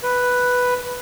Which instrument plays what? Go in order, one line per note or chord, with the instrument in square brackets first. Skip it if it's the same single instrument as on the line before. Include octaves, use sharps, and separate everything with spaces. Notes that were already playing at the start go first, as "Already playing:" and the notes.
[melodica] B4